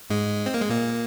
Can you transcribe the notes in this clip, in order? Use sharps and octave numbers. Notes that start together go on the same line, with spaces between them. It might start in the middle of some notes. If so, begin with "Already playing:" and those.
G#2 G#3
C4
A#3
G#3
A#2 A#3